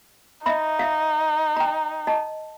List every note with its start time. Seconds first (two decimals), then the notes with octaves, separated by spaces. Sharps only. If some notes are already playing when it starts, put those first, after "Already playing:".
0.46 D#4 D#5 E5 B5
0.79 E5 F5
1.57 G5 A#5
2.07 D#5 A5